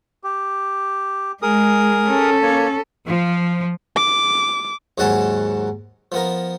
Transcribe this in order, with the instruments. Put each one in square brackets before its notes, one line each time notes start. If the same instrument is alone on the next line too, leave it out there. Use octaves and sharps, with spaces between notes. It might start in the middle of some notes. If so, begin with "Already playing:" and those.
[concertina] G4
[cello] G#3 [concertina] G#4 A#4 D#6
[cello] C#4 A4
[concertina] A#3 C#5
[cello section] F3
[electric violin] D6
[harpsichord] D#2 G#2 F#3 F#5 G#5 A5
F3 B3 A#4